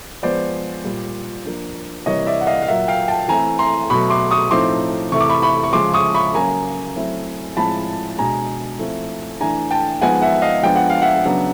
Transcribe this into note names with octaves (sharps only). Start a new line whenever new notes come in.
F3 G#3 B3 C5 D5
A#2 G3 A#3
F3 A#3 D4
C3 E3 G3 A#3 C#5 D#5
D5 E5
F#5
D#5 F5
F5
A#2 F#3 A#3 E5 F#5
F5 G5
G5 A5
E3 A3 C4 E4 G#5 A#5
A#5 C6
B2 F#3 A3 B5 C#6
C6 D6
C#6 D#6
A2 F3 A3 C4 D#4 C6 D6
C3 E3 A3 C#6
D6
B5 C#6
B5 C#6
C#6
C#3 F3 G#3 C#4 C6 D6
C#6 D#6
B5 C#6
C#3 F#3 A#3 G#5 A#5
F#3 A3 C4 E4
A2 F3 G#3 C4 E4 A5 B5
B2 G#3 B3 D4 G#5 A#5
F3 A3 C4 E4
E3 A3 D4 G#5 A#5
G5 A5
F3 G#3 B3 D#4 F#5 G#5
E5 F#5
D#5 F5
F3 G#3 B3 D4 G5
F#5
F5
E5 F#5
C#3 F#3 B3 D4